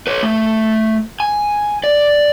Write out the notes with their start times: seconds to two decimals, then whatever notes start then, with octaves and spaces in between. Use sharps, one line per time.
0.07 B4 C#5
0.23 A3
1.20 G#5
1.84 D5